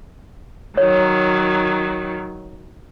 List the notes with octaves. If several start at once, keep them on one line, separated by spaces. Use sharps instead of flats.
D#3 F#3 C#5